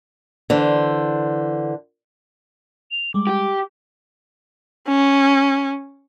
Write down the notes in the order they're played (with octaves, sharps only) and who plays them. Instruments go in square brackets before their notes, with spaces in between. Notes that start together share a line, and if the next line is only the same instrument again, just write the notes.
[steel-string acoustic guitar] D3 E3 C5
[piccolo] F7
[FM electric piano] G3 G#3 [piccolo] D6
[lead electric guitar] G4
[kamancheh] C#4